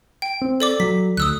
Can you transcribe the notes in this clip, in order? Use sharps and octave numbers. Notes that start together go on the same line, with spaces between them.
G5
C4
A4 D5 D6
F#3 B6
D2 D#6 E6 F#6